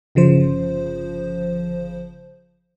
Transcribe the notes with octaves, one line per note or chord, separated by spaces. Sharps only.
G1 C#3 F3 C5